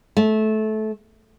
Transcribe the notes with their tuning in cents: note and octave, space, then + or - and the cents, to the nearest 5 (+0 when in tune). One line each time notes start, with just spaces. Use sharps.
A3 -20